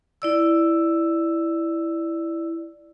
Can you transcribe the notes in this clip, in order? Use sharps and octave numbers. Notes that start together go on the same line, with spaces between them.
E4 D5 E6